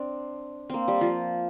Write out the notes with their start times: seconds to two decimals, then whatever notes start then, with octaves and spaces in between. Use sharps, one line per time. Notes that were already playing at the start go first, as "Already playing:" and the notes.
Already playing: C4 D4
0.70 A#3 C4
0.88 G3
1.01 F3